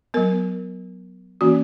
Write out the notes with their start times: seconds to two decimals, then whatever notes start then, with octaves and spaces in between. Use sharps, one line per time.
0.14 F#3 B3 A#4
1.41 E3 A#3 C#4 F#4